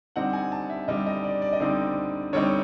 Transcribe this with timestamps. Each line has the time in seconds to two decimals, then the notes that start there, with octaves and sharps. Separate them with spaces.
0.16 D3 G3 C4 D#4 F#5
0.33 G#5
0.52 A5
0.70 E5
0.88 D3 G3 C4 D#4 D#5
1.06 D#5
1.24 D5
1.42 D5
1.53 D#5
1.60 D3 G3 C4 D#4 D5
2.33 D3 G3 C4 D#4 C#5